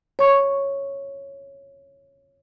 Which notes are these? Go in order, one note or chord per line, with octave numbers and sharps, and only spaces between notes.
C#5 C#6